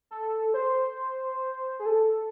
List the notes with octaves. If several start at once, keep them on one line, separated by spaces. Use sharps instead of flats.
A4
C5
G#4
A4